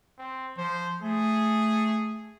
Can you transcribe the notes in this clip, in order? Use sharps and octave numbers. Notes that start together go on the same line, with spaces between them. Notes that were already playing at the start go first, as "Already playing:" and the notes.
C4
F3 C5
A3 G#4